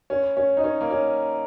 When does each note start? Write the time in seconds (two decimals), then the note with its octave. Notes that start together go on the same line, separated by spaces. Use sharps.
0.10 C#4
0.37 C#4
0.57 D#4
0.64 C#4
0.81 A#3
0.91 C#4